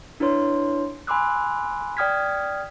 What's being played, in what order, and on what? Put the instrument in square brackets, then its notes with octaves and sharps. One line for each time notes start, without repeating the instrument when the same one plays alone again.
[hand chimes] D4 E4 B4 C#5 C6
G#5 B5 C6 D6 E6 F#6
D5 G5 D#6 F6 G#6 B6